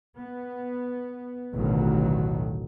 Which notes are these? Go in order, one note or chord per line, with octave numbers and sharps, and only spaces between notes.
B3
A1 D2 B2 D#3 F#3